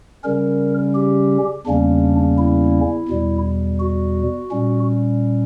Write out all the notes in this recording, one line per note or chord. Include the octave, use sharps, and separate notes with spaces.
C#3 G3 C#4 A#4
G4
E2 C#3 G3 A#3 C#4 D4
E4
E2 B2 G3
F#4
A#2 G3 C#4